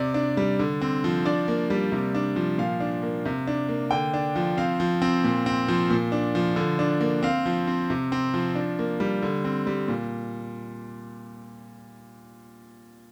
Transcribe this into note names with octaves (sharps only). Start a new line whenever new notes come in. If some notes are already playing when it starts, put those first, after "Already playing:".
Already playing: C3 D5
D4
G3
D3
C4
F3
D4 D5
A#3
G3
C3
D4
F3
A#2 F5
D4
A#3
C3
D4
A#3
D3 G5
D4
F3
C4 F5
F3
C4
A#2
C4
F3
A#2
D4
F3
D3
D4
A#3
C4 F5
F3
C4
C3
C4
F3
D4
A#3
G3
D3
C4
G3
A#2